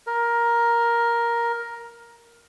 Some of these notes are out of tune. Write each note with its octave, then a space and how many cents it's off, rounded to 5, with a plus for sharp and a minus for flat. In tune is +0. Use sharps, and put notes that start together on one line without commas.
A#4 +10